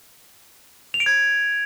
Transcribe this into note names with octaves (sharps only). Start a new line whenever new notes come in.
F7
D7
G#6